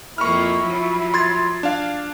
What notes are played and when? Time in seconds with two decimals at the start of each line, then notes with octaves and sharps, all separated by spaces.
0.18 F2 A#3 E4 C#6 F6
0.64 F3 F#3
1.14 C6 G#6 A6
1.63 D4 F5